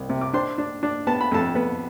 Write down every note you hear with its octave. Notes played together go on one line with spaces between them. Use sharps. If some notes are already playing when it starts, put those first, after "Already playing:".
Already playing: C2
C3
D6
D4 C5 C6
D4
D4
B3 A5
B5
F2 A4 A5
B3